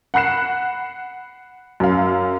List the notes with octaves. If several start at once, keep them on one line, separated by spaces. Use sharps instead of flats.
F#5 B5 F#6 C7 E7
F#2 F5